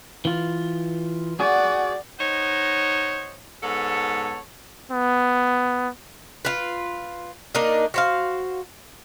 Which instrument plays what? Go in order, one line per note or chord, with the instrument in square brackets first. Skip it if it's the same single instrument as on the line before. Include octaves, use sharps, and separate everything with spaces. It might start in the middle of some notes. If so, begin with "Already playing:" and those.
[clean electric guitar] E3 F4
[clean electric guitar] F#4 G#4 [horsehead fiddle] D5 F#5
[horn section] D#4 C5 C#5 D#5 F#5
G#2 B3 A4 C#5 A5
[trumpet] B3
[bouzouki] F4 B4
A#3 D4 D#4 D#5
F#4 C5 F5